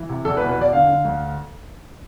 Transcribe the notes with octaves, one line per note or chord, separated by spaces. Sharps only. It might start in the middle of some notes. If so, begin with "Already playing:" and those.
Already playing: E3
C3
E2 A4
B4
B2
B4
E2 D5
D3 F5
D3
D2